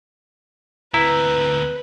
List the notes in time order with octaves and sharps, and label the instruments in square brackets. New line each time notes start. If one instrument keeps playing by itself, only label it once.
[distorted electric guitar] D2 C4 [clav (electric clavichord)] E4 [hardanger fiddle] B4 [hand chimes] A#5